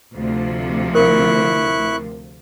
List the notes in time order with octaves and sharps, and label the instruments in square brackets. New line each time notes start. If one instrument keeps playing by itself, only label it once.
[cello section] D2 C3 F3
[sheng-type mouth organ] E4 C#6 F#6 [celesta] A#4